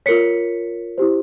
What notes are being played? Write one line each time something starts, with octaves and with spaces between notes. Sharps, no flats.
F4 A#4 C#5 B6 C#7
E4 G4 C5